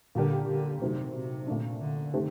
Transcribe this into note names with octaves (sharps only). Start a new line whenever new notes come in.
A#2 D3 G3 D4 G4 A#4
D3
C3 D#3 F#3 A3 C4
C3
A#2 A3 D4
D3
C3 D#3 A3 C4 G4